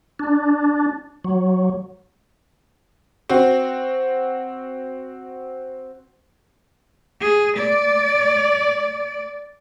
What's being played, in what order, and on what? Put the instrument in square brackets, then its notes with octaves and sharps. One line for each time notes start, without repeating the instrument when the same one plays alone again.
[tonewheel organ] D4
F#3
[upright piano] C4 F#4
[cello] G#4
D5